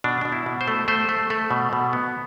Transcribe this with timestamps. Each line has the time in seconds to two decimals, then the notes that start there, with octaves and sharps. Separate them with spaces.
0.04 B2 D4
0.21 B2 D4
0.32 E4
0.46 B2
0.61 C5
0.68 A3
0.88 A3 C5
1.09 A3
1.30 A3
1.51 B2
1.73 B2
1.93 B3